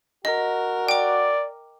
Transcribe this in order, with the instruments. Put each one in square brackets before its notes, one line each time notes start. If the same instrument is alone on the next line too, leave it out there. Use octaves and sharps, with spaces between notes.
[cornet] F#4 [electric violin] A#4 [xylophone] D#5
[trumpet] D5 [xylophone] G5 D6